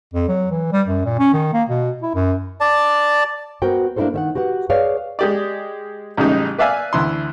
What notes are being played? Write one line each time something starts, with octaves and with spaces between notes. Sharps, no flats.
F2
F#3
E3
G3
F#2
A#2
C#4
D#3
A#3
B2
E4
F#2
D5 A5
B3 F#4 A#4 C5 G5
A#3 D4 E4 F#4 A4 C5
D#3 E5 F#5
F#4 G4 B4 F#5
G#4 B4 C#5 D5 F5
G#3 G4 D5
A1 C#3 G3 G#3 D#4
B4 D5 E5 F5 G#5
D2 E3 C6